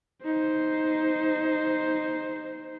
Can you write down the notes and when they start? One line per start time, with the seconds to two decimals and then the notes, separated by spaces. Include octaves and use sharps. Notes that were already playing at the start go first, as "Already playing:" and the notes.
0.24 D#4 C5